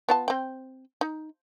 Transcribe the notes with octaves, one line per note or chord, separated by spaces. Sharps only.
B3 F4 A5
C4 G5
D#4